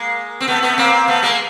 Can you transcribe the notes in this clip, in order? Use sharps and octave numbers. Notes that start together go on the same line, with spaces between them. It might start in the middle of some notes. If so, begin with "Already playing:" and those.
Already playing: G#3 A#3
C4
A3 B3
A3 B3
A#3 C4
A3 B3
G#3 A#3